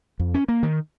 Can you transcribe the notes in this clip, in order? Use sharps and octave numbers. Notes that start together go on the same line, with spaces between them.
F2
C#4
A#3
D#3